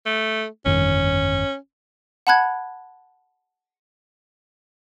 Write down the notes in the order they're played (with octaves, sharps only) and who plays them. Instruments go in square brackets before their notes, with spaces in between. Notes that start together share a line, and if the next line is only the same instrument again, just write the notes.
[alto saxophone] A3
[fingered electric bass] G1 F2 D#3 [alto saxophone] C#4
[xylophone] F#5 A5 B5 F#6 G#6